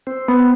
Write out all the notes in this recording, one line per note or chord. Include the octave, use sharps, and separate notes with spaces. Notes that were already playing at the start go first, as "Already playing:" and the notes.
C4
B3